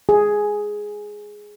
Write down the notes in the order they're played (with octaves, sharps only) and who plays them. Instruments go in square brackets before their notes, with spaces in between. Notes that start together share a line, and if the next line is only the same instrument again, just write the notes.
[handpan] G#4